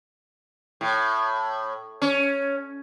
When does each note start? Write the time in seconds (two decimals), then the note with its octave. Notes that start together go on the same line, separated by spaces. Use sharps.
0.81 A2
2.02 C#4